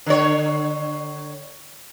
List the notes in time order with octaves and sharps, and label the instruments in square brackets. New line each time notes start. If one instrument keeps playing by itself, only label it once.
[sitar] D3 C#5